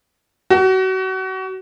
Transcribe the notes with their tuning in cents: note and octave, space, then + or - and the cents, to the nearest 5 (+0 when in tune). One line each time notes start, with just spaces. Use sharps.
F#4 +30